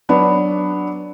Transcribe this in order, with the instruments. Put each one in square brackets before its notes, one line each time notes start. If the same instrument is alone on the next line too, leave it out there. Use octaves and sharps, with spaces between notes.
[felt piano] F#3 B3 D4